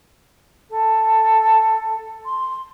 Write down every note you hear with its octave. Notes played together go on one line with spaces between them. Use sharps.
A4
C6